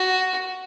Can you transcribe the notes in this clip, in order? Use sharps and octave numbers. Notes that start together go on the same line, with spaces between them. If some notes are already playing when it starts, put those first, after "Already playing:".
Already playing: F#4